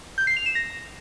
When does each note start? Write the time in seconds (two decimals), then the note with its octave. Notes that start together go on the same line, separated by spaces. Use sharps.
0.18 G6
0.27 C7
0.37 F7
0.46 E7
0.55 A#6